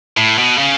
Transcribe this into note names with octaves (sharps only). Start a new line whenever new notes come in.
A2
B2
C#3